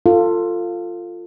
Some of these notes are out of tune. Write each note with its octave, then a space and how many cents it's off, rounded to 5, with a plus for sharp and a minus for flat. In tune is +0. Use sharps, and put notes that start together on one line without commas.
F4 +0 A4 +25